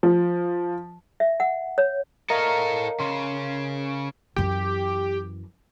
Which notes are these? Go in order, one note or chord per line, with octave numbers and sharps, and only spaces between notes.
F3
E5
F#5
C#5
A4 A#4 C#5 D#5 F5
C#3 C6
F#2 E3 G4